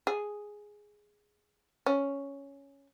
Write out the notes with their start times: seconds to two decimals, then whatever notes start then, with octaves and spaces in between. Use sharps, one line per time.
0.07 G#4
1.86 C#4